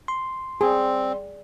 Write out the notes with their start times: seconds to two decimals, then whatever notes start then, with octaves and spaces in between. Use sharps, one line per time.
0.08 C6
0.61 G3 C4 G#4